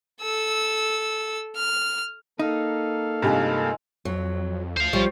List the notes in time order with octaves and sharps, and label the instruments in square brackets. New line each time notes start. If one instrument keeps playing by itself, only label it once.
[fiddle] A4 E6
F6
[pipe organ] A#3 A4 F5 [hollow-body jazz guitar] D#4
[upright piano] G2 C3 G4 [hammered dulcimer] D#3 G#3 F4
[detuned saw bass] F2 [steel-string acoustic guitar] F#3
[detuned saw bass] D2 [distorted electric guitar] C5 F5
[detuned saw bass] B1 [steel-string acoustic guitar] F3 G3 C#5